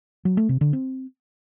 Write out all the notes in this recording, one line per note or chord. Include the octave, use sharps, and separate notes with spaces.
F#3
A3
C3
D3
C4